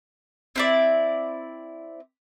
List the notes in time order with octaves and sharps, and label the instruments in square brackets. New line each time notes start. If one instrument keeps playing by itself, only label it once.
[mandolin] C4 E4 D5